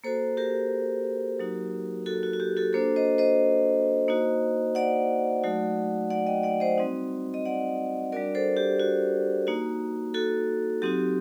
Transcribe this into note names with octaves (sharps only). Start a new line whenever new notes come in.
A#3 F#4 A4 C5
G4 A#4
F#3 A#3 D#4 F#4
F#4 A4
F#4
F#4
G4
F#4 A4
A#3 D4 F#4 A4 C5
C5 D#5
C5 D#5
A#3 D#4 F#4
D5 F#5
F#3 A3 D#4 F#4
D5 F#5
D#5 G5
D5 F#5
C5 D#5
G3 C4 D#4 F#4
D#5
D5 F#5
G3 D4 F#4 A#4 D5
A4 C5
G4
F#4
A#3 D#4 F#4
F#4 A4
F#3 C4 D#4 F#4 G4